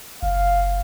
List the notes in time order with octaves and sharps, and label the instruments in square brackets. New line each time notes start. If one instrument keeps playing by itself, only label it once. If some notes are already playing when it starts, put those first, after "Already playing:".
[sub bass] F#1 [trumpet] F5